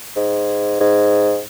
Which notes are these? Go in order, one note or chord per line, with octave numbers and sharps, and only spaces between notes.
G#2
G#2